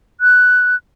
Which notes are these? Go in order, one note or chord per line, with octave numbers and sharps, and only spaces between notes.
F#6